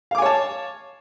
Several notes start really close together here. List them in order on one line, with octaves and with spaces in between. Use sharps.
F5 D6 G#5 C#5 A5